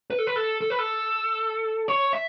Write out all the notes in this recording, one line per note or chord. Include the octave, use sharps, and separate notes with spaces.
B4
A4
B4
A4
A4
B4
A4
C#5
E5